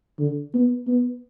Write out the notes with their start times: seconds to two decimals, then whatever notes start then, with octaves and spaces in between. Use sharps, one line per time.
0.19 D3
0.54 B3
0.87 B3